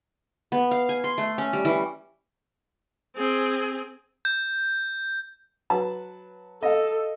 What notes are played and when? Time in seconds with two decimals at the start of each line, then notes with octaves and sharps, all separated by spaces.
0.52 B3
0.71 F5
0.89 G#5
1.04 C6
1.18 A3
1.38 C#4
1.53 G3
1.65 E3
3.16 C4 G#4
4.25 G6
5.70 F#3 B4 A5
6.63 A4 D#5 F5